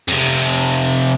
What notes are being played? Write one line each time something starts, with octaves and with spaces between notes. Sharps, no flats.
F2 C3